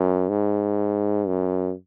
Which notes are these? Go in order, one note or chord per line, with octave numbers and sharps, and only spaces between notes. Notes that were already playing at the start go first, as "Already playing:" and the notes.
Already playing: F#2
G#2
F#2